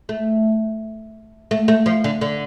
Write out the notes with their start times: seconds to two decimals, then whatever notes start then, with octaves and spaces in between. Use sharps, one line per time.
0.09 A3
1.51 A3
1.68 A3
1.86 F3
2.04 D3
2.21 D3